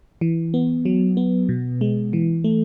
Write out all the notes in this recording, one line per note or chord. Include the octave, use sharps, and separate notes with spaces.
E3
B3
F#3
B3
B2
G#3
E3
A3